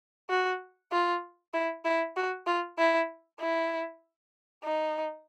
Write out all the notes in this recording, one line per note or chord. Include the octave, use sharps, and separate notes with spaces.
F#4
F4
E4
E4
F#4
F4
E4
E4
D#4